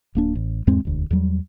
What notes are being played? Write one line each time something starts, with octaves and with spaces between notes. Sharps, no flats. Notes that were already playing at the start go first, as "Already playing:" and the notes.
D1 A#3 D4
A1
E2 G#2 G#3 C4
E1 D2
E2 F#3 G3